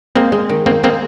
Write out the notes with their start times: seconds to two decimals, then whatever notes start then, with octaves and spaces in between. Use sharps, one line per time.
0.15 G#3 A#3 C4
0.32 G#3
0.49 D#3
0.66 D#3 A#3 C4
0.83 G#3 A#3 C4